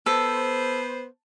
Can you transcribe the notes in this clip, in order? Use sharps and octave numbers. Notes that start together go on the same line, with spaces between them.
B3 A4 C5